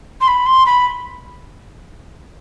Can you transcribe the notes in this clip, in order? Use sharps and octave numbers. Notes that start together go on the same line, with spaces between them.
C6
B5
C6
B5